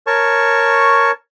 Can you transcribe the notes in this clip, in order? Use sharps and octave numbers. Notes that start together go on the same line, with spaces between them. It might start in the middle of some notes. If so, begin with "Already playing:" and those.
A#4 C#5 A5 C#6